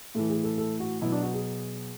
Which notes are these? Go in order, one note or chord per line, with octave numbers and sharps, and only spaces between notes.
A2 E3 A4
G#4
A4
A4
F#4
B2 F#3 E4
D4
F#4
G#4